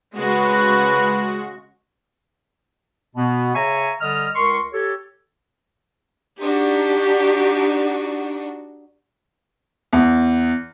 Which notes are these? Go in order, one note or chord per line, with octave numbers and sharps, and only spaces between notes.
C#3 G#3 F#4 B4
B2 B3
C#3 C#5 E5 G#5 A#5 C#6
D3 G3 D#5 F6
C#2 A#4 C6 C#6
G4 A4 C#5
D4 D#4 F#4 G4
E2